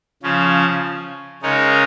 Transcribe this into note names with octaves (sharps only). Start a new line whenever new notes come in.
C#3 F3 C#4
C#3 G#3 D#4 A#4 C#5